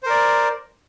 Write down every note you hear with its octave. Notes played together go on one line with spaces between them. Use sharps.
A#4 C5 D5